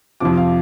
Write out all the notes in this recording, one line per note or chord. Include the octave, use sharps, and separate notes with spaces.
F2 C3 F3 D6
F5